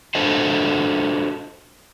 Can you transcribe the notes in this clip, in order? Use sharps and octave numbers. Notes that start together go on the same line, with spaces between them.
D4 F4 F#4 A4 C5 D#5